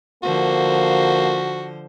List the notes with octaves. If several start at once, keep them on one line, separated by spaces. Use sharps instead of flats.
D3 F3 A#3 F#4 C5